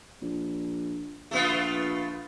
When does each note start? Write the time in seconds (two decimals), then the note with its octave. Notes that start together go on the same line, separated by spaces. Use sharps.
0.21 A#1
1.31 A#1 A3 B3 F4